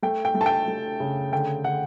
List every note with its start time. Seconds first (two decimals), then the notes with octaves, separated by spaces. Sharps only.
0.02 A3 G5
0.25 G5
0.35 A3
0.41 A5
0.46 G5
0.67 A3
1.00 C#3
1.32 D3 G5
1.64 D3 F#5